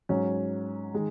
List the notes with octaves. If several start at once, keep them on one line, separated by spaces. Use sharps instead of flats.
G#2 F#3 C#4
D#3 G#3